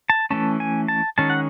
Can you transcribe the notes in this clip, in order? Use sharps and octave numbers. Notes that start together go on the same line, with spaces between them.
A5
E3 A3 C#4 A5
G#5
A5
D#3 G#3 C#4 A5
F#5